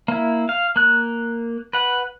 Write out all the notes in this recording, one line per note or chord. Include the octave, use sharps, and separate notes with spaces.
A#3 E4
F5
A#3 F#6
B4 F#5